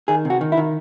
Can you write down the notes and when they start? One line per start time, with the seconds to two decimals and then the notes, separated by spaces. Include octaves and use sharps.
0.08 D#3 G#4
0.25 C3
0.30 F#4
0.41 D#3
0.52 E4
0.57 D#3